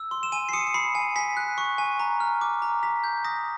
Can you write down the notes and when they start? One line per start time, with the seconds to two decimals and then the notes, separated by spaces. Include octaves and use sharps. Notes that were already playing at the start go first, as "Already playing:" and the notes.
Already playing: E6
0.11 C6
0.23 E7
0.32 G#5 D#7
0.49 C7
0.53 D#6 C#7
0.67 C#7
0.74 B5 C7
0.95 G#5
1.16 G#5 B6
1.37 F#6
1.58 C#6
1.78 G#5
1.99 A#5
2.20 F6
2.41 D6
2.62 A#5
2.83 A#5 B6
3.04 G6
3.24 D#6 A#6